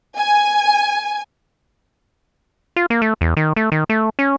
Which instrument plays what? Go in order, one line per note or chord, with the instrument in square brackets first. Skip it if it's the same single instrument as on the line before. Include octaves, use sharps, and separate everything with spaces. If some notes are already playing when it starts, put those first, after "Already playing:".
[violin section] G#5
[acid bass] F4
A#3
A3
E2
D#3
A3
D#3
A3
C#4